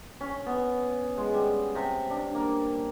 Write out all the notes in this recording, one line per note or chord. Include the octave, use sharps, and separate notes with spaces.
C#4
B3
G#3
G3
C3
D4
A#3